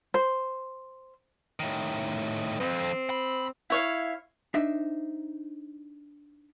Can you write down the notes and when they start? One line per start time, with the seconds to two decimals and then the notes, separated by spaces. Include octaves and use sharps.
0.14 C5
1.60 A2 D#3
2.60 F2 C4
3.10 B5
3.70 E4 C#5 F5
4.54 D4 D#4 C5 E5